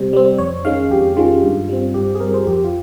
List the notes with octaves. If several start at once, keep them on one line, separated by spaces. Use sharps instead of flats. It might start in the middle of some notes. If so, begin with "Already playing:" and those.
Already playing: C3 G3 C4
G3 C4
F2 C#5
D#3 G#3 C#4 F5
F2 G4
D#3 G#3 C#4 F4
G2
G3 C4
G2 G4
G#4
G3 C4 A#4
C5
F2 G4
F4